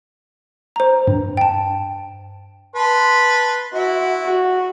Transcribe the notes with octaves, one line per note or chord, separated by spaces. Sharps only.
C5 A#5
G2
G5 A5
B4 A5 C6
E4 F#4
F#4